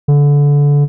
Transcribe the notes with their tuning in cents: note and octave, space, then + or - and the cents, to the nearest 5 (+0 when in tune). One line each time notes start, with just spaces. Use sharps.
D3 -25